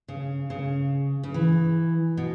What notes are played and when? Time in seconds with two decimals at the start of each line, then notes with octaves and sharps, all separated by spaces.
0.08 C#3
0.50 C#3
1.23 C#3
1.34 E3
2.17 B2